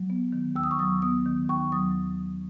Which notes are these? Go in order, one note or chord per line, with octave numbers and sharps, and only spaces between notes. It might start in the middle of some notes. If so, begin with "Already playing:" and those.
Already playing: F#3
B3
D#3
D#2 E6
D#6
C#6
F#3 D#6
B3 D#6
D#3
D#2 C#6
F#3 D#6